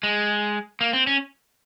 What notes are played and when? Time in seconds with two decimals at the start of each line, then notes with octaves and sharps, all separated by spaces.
0.03 G#3
0.81 A#3
0.93 C4
1.07 C#4